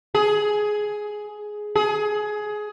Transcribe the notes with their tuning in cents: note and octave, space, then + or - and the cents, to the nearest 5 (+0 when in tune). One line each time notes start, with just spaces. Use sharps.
G#4 +10
G#4 +20